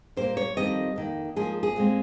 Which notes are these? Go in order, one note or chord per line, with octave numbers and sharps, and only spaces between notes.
A#2 G3 A#3 C5
C#5
F2 C3 D#3 G3 C4 D#5
F2 D#3 A#3
G#2 F3 A#3 G#4
G#4
A#2 G#3 C4